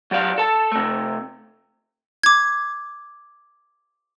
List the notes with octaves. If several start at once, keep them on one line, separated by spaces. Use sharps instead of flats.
F#3 G4 D5 F5
A4 A5
C3 A3
D6 G#6